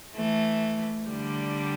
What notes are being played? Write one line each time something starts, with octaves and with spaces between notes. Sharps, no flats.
E3 A3
D3 G3